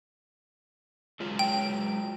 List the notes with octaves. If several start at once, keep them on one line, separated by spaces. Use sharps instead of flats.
F#3 G#3 F4
G5